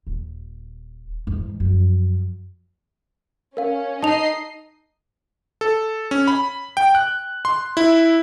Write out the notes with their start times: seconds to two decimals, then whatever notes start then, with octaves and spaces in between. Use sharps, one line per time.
0.07 D#1
1.27 E2 G#2
1.60 F#2 F3
3.57 C#4 A#4 F5
4.03 D#4 D#5 A5 C7 F7
5.61 A4
6.11 C#4
6.27 B5
6.77 G5
6.95 F#6
7.45 C6
7.77 E4